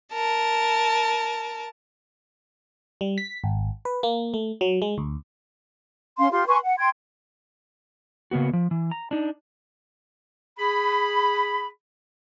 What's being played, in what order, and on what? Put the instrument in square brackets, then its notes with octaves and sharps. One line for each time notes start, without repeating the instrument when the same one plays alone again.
[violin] A#4 A5
[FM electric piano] G3
B6
G#1
B4
A#3
A3
F#3
G#3
D2
[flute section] C#4 F5 C6
F4 G4 C6
B4 G#5 C6 C#6
F#5
G5 C6 G#6
[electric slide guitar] C#3 A#3 B3 F#4
F3
E3
A#5
D4 D#4
[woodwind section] G#4 B5